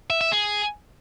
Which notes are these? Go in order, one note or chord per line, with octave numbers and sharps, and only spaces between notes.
E5
E5
G#4